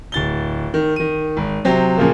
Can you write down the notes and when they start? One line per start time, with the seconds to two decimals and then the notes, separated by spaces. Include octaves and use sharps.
0.12 D1 A6 G7
0.74 D#3
0.96 D#3 D#7
1.37 G#1
1.65 C3 F#3 C5 G5
1.97 A#2 C#3 F3 A#3